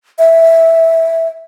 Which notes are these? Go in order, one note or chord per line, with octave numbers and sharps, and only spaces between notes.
E5